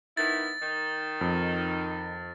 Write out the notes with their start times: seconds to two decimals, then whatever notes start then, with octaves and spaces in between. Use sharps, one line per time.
0.17 D#3 B3 E4 A6
0.61 D#3 D#4
1.21 F2